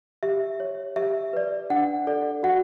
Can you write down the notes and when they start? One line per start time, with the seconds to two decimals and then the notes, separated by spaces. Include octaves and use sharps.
0.23 G4 E5
0.60 C#5
0.96 G4 E5
1.33 B4 D5
1.70 D4 F#5
2.07 A4 D5
2.43 F#4 F#5